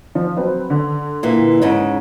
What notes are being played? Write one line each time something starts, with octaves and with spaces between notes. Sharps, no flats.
F3
F#3 C4 B4
D3
A#2 E3
G#2 C#3 D#4